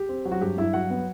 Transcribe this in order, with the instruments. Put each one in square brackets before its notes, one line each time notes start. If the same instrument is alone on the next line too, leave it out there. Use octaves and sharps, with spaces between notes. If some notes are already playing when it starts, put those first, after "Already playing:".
Already playing: [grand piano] G4
C4
F#3
F#4
G2 G4
G2 E4 E5
F#3 F#4 F#5
B3